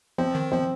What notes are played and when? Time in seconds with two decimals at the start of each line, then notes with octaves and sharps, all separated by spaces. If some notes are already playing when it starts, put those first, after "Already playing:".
0.18 F3 C4
0.35 D#3
0.52 F3 C4